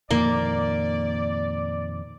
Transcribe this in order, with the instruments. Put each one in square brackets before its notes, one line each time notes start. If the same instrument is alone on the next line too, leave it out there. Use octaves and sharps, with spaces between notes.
[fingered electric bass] F2 A#2 D#3 [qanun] A#3 [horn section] D5